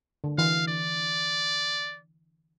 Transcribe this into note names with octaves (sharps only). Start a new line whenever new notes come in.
D3
E3 F5
D5